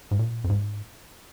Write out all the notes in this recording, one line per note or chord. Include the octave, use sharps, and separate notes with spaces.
G#2
A#2
F2
G#2